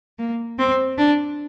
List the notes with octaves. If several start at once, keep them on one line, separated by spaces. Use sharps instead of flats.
A#3
C4
D4